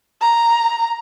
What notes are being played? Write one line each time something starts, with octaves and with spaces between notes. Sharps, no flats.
A#5